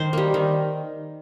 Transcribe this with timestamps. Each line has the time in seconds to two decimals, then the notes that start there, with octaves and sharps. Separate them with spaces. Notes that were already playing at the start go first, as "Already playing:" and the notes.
Already playing: D#3 C5
0.13 G3 A#3
0.34 D#3